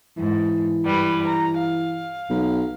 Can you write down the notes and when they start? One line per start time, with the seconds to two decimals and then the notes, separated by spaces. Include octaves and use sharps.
0.17 G#2 E3
0.84 G2 G3 B4
1.27 A#5
1.60 F5
2.30 B1